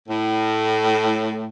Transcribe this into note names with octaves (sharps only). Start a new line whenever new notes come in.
A2